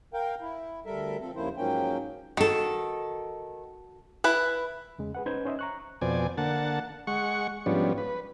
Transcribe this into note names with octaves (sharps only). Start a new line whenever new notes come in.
A#4 F5 G5
E4
D2 G3 A4 A#4 E5
F3 C4 A4
D#2 C#3 F3 A#3 E4 C5
G#2 F3 F#3 A#3 C#4 G5
D#3 F#4 A4
E4 B4
E2 C#3 G#3
G#4 B4 F#5
C#4 D#4 B4 C5 G6 G#6
C#4 C5 D#5 E5
A#5 C#6 F#6
F2 B2 C4 D5 G#5
D3 A#3 F#5 A5
G#3 F#5 C#6
G#2 F3 G3 B3 C#4 D4
B4